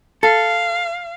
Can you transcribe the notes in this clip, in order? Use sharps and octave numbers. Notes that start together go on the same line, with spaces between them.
A4 F5